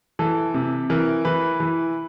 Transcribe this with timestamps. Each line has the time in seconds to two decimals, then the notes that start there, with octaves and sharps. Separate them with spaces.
0.19 E3 A4
0.54 C3
0.90 E3 A#4
1.25 E3 B4
1.60 E3